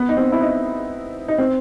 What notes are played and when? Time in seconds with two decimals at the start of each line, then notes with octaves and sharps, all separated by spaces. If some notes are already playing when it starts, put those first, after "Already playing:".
Already playing: B3
0.09 D#4
0.17 C4
0.32 E4
0.41 D#4
1.28 D#4
1.38 C4